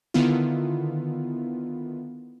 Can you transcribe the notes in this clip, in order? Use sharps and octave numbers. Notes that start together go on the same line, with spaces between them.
D3 D#3 B3 E4 F4